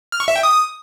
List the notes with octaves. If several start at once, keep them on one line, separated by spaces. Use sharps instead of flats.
F6
C#6
E5
G5
D#6